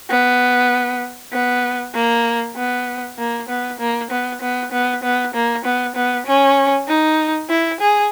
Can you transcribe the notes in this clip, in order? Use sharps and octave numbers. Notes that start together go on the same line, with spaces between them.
B3
B3
A#3
B3
A#3
B3
A#3
B3
B3
B3
B3
A#3
B3
B3
C#4
D#4
E4
G#4